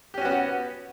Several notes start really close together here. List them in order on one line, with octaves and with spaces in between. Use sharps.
G4 C#4 F#4 B3